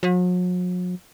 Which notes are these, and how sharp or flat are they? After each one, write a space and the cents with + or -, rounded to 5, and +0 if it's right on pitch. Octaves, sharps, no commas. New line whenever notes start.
F#3 -45